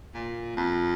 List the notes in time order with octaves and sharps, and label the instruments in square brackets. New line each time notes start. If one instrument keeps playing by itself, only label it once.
[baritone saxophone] A#2
F2